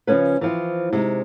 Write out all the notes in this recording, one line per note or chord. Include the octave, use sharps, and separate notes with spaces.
C#3 F3 G#3 A3 C#4 B4
E3 F3 C4
C3 G#3 D#4